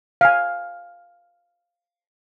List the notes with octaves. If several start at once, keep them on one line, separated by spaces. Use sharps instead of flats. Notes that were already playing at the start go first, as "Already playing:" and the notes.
F5 G#5